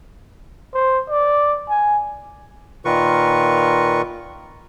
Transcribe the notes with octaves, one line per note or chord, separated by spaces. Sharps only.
C5
D5
G#5
A#2 D#3 F4 A#4 B4 C#6